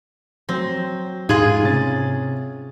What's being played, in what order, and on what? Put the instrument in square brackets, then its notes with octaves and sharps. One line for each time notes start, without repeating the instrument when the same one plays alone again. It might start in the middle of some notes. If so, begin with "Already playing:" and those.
[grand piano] F#3 A#6 [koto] C4
[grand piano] G#2 G#3 F#7 [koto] F4 G#4
[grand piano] C3 C#4 A6